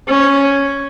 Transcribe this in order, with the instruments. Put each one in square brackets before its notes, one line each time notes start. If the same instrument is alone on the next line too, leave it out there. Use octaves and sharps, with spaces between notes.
[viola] C#4